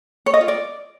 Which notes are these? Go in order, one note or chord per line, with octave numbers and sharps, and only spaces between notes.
C#5
D#5
F4
D5